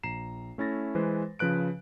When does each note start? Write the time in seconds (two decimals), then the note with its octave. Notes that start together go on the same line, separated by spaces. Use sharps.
0.03 A#1 A#5 C7 E7
0.58 A3 C#4 E4 A6 A#6
0.95 E3 G#3 B4 C5
1.39 C#3 F3 B4 F#6 D7